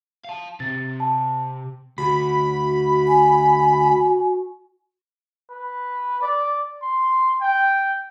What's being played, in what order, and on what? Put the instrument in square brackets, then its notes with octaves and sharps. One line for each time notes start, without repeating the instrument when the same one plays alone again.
[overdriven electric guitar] F5 A5
[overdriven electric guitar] C3 [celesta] A6
[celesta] A5
[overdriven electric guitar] D2 [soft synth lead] F#4 [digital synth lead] B5
[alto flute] G#5
[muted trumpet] B4
D5
C6
G5